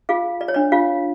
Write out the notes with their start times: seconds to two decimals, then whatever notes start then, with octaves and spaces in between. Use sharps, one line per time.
0.09 F4 G#4 F5
0.41 D5
0.48 C#5
0.54 D4 D5
0.72 F4 F5